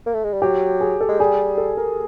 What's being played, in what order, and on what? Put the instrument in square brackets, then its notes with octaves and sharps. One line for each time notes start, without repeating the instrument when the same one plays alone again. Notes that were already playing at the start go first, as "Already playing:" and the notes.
[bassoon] A#3
A3
G#3
G3
[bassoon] F#3 [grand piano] G4
[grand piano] G#4
A4
[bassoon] G#3
[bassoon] G3 [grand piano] G#4
[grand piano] A4
A#4